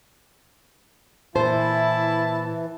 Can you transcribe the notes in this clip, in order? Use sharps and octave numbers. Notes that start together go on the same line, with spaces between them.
A#2 E3 E4 C5 A5